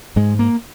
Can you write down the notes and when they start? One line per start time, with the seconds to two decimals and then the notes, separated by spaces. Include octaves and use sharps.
0.16 G#2 G#3
0.39 A#3